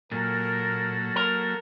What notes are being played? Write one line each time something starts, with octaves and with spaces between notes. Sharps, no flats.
A#2 F#3 A#3 A4 A#4
A#4